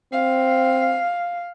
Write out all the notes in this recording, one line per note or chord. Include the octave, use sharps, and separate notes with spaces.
C4 F5